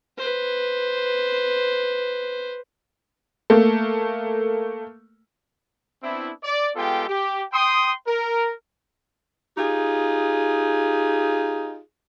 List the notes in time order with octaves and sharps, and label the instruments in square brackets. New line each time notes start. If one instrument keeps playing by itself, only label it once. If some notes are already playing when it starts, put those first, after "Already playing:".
[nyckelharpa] B4 C5
[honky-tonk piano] A3 A#3
[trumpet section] B3 C4 D4 E4
D5
G#3 B3 F4 G4 A4 G5
G4
G5 C6 D#6
A#4
[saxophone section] D#4 F4 G4 G#4